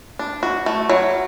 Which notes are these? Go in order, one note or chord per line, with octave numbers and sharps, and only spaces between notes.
D4
F#4
A3
F#3